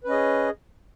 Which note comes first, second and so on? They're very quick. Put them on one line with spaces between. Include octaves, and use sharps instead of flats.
B4 C#4 D#5 G#4